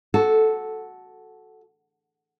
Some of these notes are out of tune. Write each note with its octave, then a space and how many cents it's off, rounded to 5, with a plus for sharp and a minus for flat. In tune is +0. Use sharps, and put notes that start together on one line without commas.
F#4 +0 A4 -10